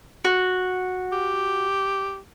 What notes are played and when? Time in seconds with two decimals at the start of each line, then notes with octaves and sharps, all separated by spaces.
0.25 F#4
1.12 G4